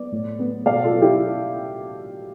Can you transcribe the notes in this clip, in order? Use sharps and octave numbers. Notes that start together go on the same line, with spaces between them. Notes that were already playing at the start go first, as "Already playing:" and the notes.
Already playing: B3 D5
A2
B3
B2 D5 F5
F4 A4
B3
E4 G4